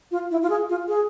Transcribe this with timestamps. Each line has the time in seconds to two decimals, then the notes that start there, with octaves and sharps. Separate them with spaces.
0.11 F4
0.31 E4
0.42 F4
0.50 G#4
0.69 F4
0.88 G#4